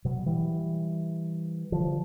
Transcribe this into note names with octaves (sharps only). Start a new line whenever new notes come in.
B2 F#3
E3 G3
D3 F3